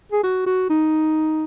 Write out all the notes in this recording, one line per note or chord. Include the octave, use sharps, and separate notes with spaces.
G#4
F#4
F#4
D#4